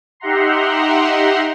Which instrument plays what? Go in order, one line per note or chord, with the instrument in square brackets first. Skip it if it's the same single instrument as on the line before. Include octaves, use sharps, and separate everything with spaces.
[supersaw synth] D#4 G4 E5 F#5 A#5 C6